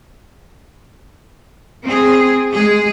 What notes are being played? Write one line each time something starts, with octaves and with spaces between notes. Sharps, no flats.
C4 G#4
G#3 G#4